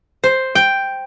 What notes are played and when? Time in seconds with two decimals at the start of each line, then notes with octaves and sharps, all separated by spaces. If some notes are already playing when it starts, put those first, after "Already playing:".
0.24 C5
0.55 G5